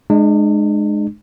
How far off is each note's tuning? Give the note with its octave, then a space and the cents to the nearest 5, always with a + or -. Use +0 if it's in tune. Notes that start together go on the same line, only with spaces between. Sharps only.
G#3 +15 D4 +45